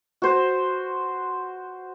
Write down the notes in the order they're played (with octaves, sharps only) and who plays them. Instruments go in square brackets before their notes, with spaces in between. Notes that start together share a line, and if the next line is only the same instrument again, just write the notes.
[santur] F#4 C5